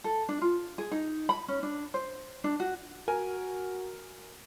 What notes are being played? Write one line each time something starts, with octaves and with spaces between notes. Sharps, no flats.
A4
D4
F4
G#4
D#4
B5
C#4
D4
C5
D4
F#4
F#4 A#4 G#5